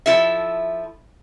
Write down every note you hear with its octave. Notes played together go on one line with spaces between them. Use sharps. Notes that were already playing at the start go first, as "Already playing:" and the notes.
F3 E4 A4 E5